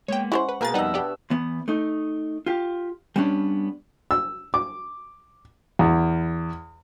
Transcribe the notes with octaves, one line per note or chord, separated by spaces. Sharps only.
G#3 A#3 B3 C#5 G5
G#3 C#4 E4 C5 F#5 C#6
B4
B2 A#3 G#4 A#4 A6
F2 B2 G3 D#4 E5 F#5
B3 D4 G4
E2 B3
A3 D#4
F4 G4
G3 B3 C#4 D4
E6
D6
E2